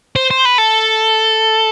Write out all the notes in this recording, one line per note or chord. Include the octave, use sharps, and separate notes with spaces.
C5
C5
B4
A4